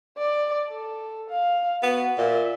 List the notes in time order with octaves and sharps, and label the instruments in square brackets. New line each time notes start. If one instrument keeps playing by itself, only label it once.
[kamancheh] D5
A4
F5
[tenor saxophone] B3 [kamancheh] F#4
[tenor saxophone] A#2 [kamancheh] E5